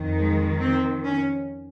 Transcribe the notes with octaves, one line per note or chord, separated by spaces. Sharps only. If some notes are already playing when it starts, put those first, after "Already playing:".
Already playing: F2 D#3
G#3
C4
C#4